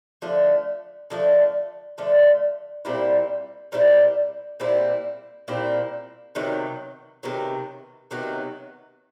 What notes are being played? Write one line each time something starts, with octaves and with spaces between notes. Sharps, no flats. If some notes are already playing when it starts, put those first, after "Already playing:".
D3 F3 A3
D3 F3 A3
D3 F3 A3
A#2 G3 C4 E4
A#2 G3 C4 E4
A#2 G3 C4 E4
A#2 G3 C4 E4
C3 D#3 F#3 B3
C3 D#3 F#3 B3
C3 D#3 F#3 B3